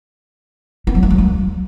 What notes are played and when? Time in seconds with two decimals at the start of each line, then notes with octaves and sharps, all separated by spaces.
0.87 B3
0.95 F#3
1.03 A3
1.10 F#3
1.18 A#3